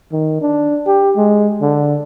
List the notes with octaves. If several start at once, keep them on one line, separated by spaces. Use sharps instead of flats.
D#3
D4
G4
G#3
D3